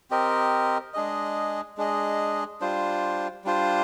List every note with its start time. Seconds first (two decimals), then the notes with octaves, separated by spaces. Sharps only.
0.10 C4 G4 A#4 D#5
0.94 G#3 D4 G#4 D#5
1.77 G#3 D4 G#4 D#5
2.61 G3 D4 F4 C5
3.44 G3 D4 F4 C5